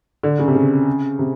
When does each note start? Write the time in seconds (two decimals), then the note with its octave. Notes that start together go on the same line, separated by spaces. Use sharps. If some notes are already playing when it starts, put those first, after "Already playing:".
0.23 D3
0.39 C#3
0.48 C3
0.55 C#3
1.19 C3